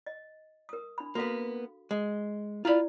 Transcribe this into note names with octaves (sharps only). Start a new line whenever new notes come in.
D#5
A#4 D#6
D4 B5
A#3 B3 F#4 A4 F5
G#3
E4 F4 D5 F5 B5